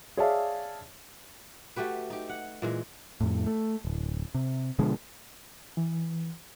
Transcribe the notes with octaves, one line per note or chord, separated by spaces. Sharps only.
G#4 C#5 D5 E5 F5 A5
A3 F#4 G4 B4
D#4 G4
F#5
A#2 E3 G#3
F2 A2
A3
D1
C3
B2 D3 F3 G#3
E3